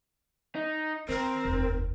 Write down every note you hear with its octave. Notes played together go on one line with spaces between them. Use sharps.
D#4
D#3 C4 A#4
F1 D#2